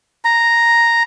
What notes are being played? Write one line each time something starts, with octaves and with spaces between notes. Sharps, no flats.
A#5